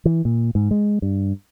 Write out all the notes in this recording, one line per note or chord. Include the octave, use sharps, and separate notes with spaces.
E3
A#2
G#2
G#3
G2